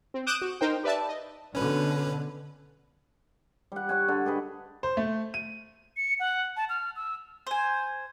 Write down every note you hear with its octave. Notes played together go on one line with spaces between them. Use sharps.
C4
D6 D#6 F#6 G6 D7 E7
F#4
D#4 A#4 C5 G5
G4 B4 D5 E5 A5
D#5
B2 D3 C#4 B4
G3 F#5
C#5 F#5 G#5
D3
G4 G#4 B4 D#5
C5
A3
D#7
C#7
F#5
A5
F6
E6
C5 G#5